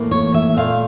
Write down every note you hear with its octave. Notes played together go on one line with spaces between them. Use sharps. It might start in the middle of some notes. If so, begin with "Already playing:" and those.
Already playing: A2 E3 A#3
C#5
E5
A#2 A3 F5